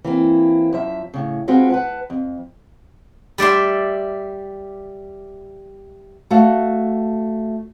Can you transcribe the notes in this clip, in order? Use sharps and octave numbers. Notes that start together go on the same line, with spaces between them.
E3 A#3 C4
F#2 F3 E5
A2 C#3
G#3 C4 F4 F#4 B4
B4 F#5 A5
F2
G3 D5 E5 C6
A3 F#4 F5